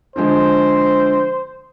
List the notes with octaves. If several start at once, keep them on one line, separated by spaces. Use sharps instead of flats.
D3 F3 G#3 C5